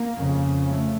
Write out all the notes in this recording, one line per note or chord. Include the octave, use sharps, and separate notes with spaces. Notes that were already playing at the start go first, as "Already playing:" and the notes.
Already playing: A#3
F2 C#3
A3